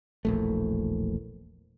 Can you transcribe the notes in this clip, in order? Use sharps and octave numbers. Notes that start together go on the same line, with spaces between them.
E1 A#1 A3